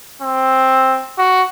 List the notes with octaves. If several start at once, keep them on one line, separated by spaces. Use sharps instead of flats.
C4
F#4